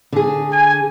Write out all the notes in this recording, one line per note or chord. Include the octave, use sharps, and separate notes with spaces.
D3 G#4
G#5